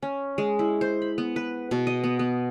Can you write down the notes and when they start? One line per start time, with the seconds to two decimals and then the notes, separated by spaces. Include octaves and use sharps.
0.02 C#4
0.38 G#3
0.59 E4
0.81 C5
1.02 B5
1.18 B3
1.36 B4
1.71 B2
1.87 D#5
2.04 B3
2.19 B3